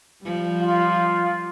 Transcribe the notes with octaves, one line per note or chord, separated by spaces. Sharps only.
F3 G3
F4